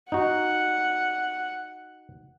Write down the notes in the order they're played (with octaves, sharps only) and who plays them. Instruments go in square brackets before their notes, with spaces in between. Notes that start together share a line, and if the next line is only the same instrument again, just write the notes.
[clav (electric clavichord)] D#4 F#4 [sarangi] F#5